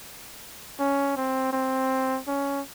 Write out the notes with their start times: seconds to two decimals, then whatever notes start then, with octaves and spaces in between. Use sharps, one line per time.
0.79 C#4
1.17 C4
1.53 C4
2.27 C#4